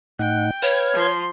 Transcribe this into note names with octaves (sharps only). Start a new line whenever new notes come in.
A2 D#4 F#5 G5
B4 C#5 F5 G#6
F3 C6